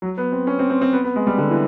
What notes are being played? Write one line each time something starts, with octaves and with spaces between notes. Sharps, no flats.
F#3
B3
C4
C#4
C4
C4
C4
B3
B3
G#3
G3
D3
E3